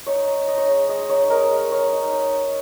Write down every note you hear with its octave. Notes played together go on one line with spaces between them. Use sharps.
D#4 C#5
D#4
D#4 D#5
C#5
G#3 D#5
G#3 D#5
D#4 C#5
G#3 A#4
G#3
G#3 C#5
D#4
D#4
D#4